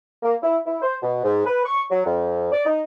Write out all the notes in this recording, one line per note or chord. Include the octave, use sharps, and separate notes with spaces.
A#3
E4
E4
C5
B2
G#2
B4
C#6
F#3
F2
D5
D#4